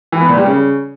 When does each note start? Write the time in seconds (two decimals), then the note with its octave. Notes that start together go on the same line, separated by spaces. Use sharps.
0.12 E3
0.21 B3
0.29 A#2
0.37 G3
0.46 C#3